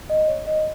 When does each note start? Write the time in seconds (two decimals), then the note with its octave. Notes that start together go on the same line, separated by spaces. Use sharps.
0.10 D#5
0.28 C#5
0.47 D#5